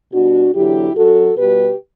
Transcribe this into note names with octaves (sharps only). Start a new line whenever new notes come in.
B2 G3 D4 F#4
E2 D3 F#3 E4 G4
F#2 F#3 F#4 A4
B2 G3 G4 B4